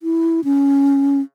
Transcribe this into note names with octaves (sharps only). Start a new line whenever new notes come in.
E4
C#4